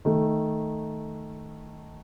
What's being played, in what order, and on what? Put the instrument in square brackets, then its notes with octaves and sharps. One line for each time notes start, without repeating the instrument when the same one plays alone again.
[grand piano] D#3 A3